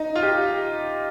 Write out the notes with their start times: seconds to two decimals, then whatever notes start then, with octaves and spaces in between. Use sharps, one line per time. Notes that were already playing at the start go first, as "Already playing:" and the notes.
Already playing: D#4
0.16 F4
0.23 G4